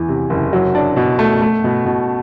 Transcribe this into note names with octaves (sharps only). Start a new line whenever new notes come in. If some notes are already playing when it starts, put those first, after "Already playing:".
Already playing: E2 E3
C3
F#1
F#3
D4
B2
A3
A3
B2
B2